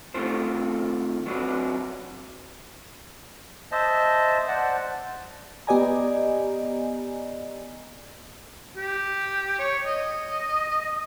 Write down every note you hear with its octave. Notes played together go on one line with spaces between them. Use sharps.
D#3 A3 C4 F4 C5
F#3 B3 C4 D4 F#4 B4
C5 D#5 E5 A5
C5 D5 F#5 A5
B3 G4 D5 D#5 G#5 A#5
G4
C#5
D#5